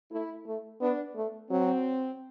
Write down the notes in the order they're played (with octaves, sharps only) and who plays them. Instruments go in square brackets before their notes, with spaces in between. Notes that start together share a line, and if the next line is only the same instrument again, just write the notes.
[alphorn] A3 [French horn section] E4
[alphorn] A3
[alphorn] B3 [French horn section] D4
[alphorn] A3
[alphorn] F#3 [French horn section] C4